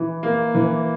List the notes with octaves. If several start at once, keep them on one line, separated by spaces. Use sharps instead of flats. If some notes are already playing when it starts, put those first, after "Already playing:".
Already playing: E3
A#3
E3